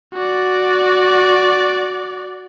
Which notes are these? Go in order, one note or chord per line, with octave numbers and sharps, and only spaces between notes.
F#4 D5